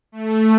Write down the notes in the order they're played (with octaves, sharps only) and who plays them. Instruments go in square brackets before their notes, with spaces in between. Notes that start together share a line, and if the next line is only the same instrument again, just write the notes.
[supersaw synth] A3